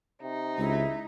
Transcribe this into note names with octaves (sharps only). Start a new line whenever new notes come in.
C3 D#4
C#2 E4